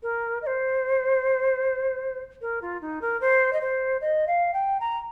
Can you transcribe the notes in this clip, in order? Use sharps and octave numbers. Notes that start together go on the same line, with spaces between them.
A#4
D#5
C5
A#4
F4
D#4
A#4
C5
D#5
C5
D#5
F5
G5
A#5